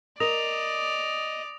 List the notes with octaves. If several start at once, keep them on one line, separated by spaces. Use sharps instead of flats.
A#4 D5 D#5 D#6 A#6 F7